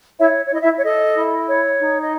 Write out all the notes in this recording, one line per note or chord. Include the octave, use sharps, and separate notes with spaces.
E4 C#5 E5
C#5
E4
D#5
E4 E5
C#5
A4 D#5
E4
C#5
D#4
D#5